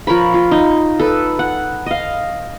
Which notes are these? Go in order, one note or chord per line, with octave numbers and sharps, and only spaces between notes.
F3 A#4 C#5 B5
F4
D#4
A4 B4
F#5
D#5 F5